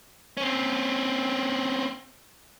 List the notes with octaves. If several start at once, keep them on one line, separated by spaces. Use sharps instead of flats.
C4 C#4